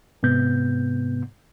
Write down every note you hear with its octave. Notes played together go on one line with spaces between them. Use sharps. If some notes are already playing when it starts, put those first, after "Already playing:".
G#2 C3 B3 G6